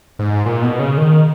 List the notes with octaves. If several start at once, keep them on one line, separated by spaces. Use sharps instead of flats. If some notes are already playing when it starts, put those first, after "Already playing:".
G#2
A#2
B2
C#3
D#3